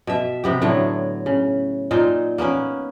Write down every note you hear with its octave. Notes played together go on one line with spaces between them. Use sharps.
B2 E5
C3 B3 G4
A2 D3 F#3 C#5
C#3
A#2 D#4 C5
A#3 B3 C#4 B4